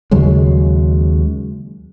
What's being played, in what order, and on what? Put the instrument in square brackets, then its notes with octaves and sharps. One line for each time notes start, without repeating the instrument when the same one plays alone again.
[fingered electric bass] D#2 C#3 F#3 G#3